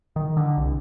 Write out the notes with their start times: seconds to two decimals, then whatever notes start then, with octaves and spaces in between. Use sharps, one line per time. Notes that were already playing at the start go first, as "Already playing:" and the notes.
0.16 D#3
0.37 D3
0.57 C2